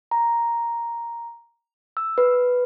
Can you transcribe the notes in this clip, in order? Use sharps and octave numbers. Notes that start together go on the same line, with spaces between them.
A#5
E6
B4